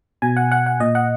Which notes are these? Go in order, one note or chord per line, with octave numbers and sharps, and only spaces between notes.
B2 G#5
F#5
F#5
F#5
A#2 D#5
F#5